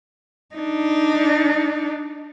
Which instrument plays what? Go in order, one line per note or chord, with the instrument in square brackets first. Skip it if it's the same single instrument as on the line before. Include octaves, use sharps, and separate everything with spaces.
[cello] D4 D#4